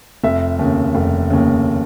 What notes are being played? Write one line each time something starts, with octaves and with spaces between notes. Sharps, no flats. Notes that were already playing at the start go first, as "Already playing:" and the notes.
F1 E5
D#2 C#3
F1
D#2 C#3